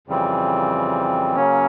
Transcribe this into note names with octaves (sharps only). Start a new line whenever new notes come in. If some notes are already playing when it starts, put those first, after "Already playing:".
F2 C#3 E3 G3 C4
C#3 F#3 A#3 C#4